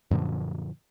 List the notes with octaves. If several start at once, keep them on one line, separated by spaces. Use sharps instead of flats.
F#2 A#2 D3 F3